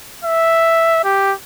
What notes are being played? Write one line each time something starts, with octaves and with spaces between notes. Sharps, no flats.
E5
G4